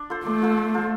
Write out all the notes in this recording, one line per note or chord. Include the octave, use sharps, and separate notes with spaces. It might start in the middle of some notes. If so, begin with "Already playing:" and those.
Already playing: D4
F4 A4 C5
A3 D4
F4 A4 C5
D4
F4 A4 C5